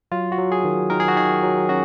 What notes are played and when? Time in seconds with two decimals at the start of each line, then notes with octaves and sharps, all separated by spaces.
0.12 F#3 F4
0.32 F#4
0.38 F#3
0.52 G#4
0.64 D#3
0.90 D#3 A#4
1.00 G#4
1.08 F#4
1.16 D#3 G#4
1.43 F#3
1.69 C#4 F#4